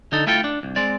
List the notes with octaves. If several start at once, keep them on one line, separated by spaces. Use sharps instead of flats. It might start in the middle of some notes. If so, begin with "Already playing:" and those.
D3 D#4 A4
A3 E4 F4 A4 G5
D4
C2
G#3 C4 D5